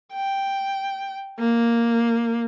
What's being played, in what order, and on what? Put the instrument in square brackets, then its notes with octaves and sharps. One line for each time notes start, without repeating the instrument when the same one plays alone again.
[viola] G5
A#3